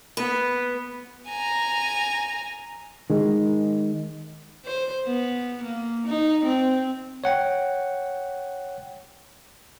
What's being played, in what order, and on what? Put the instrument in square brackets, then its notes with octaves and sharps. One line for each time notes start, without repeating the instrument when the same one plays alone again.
[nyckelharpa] B3 [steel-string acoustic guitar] B4
[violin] G#5 A#5
[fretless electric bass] D#3 G#3
[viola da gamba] C5
B3
A#3
D#4
C4
[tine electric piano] C#5 F#5 G5